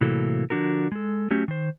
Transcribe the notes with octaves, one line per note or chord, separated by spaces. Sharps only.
A2 C3 E3 F#3 A#3 A4
D3 F3 D4 F#4 A#4
G#3 A4
F#3 A3 C#4 G4
D#3 C5